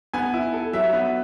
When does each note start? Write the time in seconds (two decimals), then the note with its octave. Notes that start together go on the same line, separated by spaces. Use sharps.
0.14 B3 G#5
0.34 E4
0.53 A4
0.73 F#3 E5
0.93 B3